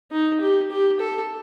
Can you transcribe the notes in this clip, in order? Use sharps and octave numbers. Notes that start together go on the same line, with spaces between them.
D#4
G4
G4
A4